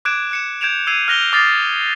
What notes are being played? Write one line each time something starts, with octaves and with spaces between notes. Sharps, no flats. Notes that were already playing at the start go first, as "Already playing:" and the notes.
D6 F#6 G#6 D7 E7
F#6 C#7 E7
G6 G#6 D7 E7 F7
E6 G#6 C7 D#7 F7
F6 F#6 A#6 F7 G7
D6 D#6 F6 A6 A#6 C7